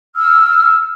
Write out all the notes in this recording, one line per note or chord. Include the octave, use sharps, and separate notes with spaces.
E6 F6